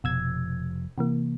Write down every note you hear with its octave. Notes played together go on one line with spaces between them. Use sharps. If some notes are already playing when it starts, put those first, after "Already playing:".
F1 B2 F3 E6 G#6
C3 E3 A#3